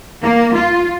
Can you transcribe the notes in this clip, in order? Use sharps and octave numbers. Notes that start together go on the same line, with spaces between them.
A#3
F4